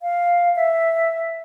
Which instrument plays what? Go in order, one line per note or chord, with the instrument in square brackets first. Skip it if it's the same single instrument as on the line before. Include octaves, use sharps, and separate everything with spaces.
[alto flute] F5
E5